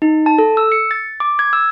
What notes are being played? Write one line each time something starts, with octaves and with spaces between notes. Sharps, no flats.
D#4
A5
A4
E6
C#7
A6
D6
G#6
E6